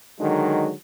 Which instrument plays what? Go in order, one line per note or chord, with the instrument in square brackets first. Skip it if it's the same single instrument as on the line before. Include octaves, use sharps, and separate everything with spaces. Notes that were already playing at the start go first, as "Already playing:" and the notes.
[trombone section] D3 D#3 F#3 G#3